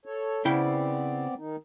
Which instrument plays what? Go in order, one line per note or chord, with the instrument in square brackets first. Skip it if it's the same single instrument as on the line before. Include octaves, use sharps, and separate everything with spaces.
[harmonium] A4 C#5
[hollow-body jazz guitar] C#3 E4 G5 [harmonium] B3 C4 D5
[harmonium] D#3 D#4